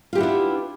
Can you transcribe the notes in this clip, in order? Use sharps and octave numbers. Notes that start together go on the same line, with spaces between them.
B3 D4 E4 F4 G4